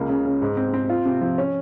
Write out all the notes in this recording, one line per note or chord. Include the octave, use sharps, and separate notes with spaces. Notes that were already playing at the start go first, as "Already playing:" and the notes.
Already playing: C#2 A#3
C#3
C#3
G#2
C4
C4
F4
C3
F3
C#4